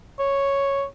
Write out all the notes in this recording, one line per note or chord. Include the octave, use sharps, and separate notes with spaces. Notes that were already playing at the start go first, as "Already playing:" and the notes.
C#5